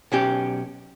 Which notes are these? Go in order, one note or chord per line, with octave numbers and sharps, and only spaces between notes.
B1 C#4 G4